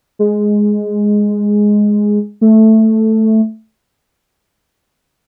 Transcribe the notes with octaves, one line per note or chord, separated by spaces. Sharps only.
G#3
A3